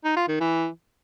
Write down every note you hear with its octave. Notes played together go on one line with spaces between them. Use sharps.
D#4
F4
D#3
E3